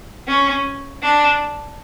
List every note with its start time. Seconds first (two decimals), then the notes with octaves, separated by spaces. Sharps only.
0.27 C#4
1.02 D4